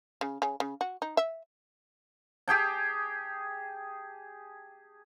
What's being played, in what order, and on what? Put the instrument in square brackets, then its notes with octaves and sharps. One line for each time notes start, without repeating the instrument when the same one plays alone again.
[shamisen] C#3
C#3
C#3
F#4
D#4
E5
[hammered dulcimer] G4 G#4 G5 A5